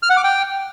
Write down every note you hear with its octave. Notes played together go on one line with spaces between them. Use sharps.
F6
F#5
D6
G5